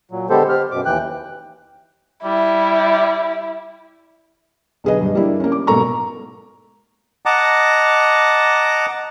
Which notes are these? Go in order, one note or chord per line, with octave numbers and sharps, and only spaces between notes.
A#2 F#3
D3 G#3 B3 G4 A4 C5
G4 C5 F6
F#2 B2 D6
D#2 E3 G5 F#6
G3 E4
B1 D3 G#4 B4 D#5
G2
G3 A#3 D4 E4
A#3 C#4
D6
G#2 B2 A#3 A4 A#5 C#6
D#5 F#5 A5 A#5 D6